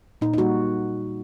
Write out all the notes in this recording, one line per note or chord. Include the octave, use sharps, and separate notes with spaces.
A#2 D#4
D#4
G3 A#3 F#4